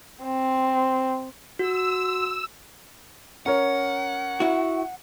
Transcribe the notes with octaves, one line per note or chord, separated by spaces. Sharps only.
C4
F#4 E6
C#4 A#4 C#5 F#5
E4 F#4